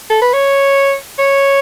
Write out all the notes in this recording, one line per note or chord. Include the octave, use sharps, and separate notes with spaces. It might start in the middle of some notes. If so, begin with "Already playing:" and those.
A4
B4
C#5
C#5